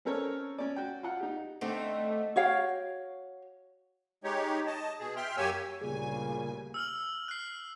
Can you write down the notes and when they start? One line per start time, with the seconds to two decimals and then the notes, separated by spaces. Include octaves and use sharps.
0.05 C4 C#4 A4 A#4 C#5
0.58 C#4 D5
0.76 F#4 G5
1.03 F4 F#5
1.20 D#4 G4
1.61 D3 A3 C4 D#4
2.36 F#4 C#5 F5 G5
4.24 G#3 D#4 G4 C#5
4.67 D#5 A5
5.00 B2 G#4
5.16 E5 G5 C6 F6
5.37 F#2 A#3 G4 C#5 G#5 E6
5.81 D2 A#2 C#3 G3 G#4 G#5
6.74 E6 F6 F#7
7.28 F#6 C7